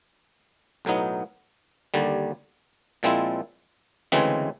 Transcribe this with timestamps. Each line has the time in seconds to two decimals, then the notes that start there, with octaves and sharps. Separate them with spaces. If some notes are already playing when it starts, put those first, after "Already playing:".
0.85 B1 A2 F#3 B3 D#4
1.94 D#2 D3 G3
3.03 A#2 F3 G#3 C4 E4
4.12 D2 C#3 E3 G#3 C4